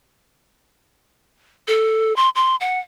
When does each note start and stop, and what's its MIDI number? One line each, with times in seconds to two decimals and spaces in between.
1.68 2.15 69
2.16 2.29 84
2.35 2.56 84
2.61 2.80 78